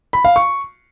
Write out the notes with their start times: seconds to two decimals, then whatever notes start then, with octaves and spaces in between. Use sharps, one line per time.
0.13 B5
0.25 F5
0.36 C#6